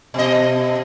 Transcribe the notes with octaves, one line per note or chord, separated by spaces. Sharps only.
B2 D#5